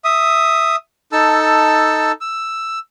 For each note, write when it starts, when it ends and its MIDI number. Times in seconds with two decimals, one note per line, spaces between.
0.04 0.76 76
0.04 0.76 87
1.12 2.12 63
1.12 2.12 69
1.12 2.12 81
1.12 2.12 88
2.21 2.79 88